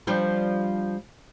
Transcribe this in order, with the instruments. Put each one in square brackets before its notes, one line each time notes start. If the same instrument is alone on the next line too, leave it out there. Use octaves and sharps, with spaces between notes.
[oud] F3 G3 D4